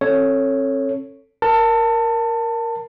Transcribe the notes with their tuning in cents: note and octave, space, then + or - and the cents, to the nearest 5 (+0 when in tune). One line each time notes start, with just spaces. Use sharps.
C4 +45 A4 +10 C#5 +0
A#4 +0 A5 +20